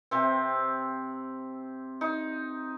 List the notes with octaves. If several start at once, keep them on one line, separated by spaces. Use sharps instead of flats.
C3 C4
D#4